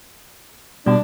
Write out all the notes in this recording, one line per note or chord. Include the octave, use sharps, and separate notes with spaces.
B2 G3 D4